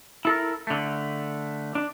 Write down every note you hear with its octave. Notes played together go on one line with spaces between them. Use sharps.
E4 A4 A#4
D3 A3
D4